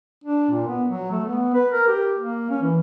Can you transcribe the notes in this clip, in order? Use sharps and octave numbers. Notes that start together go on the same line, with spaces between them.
D4
A#2
B3
F#3
A3
B3
B4
A#4
G4
A#3
C#4
E3